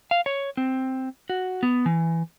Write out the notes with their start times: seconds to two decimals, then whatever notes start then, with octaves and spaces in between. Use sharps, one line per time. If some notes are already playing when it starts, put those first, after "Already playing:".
0.11 F5
0.26 C#5
0.57 C4
1.29 F#4
1.63 B3
1.86 E3